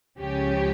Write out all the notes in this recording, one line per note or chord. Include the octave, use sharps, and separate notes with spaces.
C#2 C#3 F3 C#4 G4